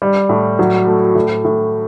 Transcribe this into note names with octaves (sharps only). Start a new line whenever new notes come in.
G3
A2
F#3
A3
A2
A2